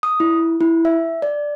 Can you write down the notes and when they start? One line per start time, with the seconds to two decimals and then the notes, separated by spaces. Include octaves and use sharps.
0.03 D#6
0.20 E4
0.61 E4
0.85 E5
1.22 D5